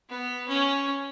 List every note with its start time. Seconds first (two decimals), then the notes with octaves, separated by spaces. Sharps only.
0.09 B3
0.48 C#4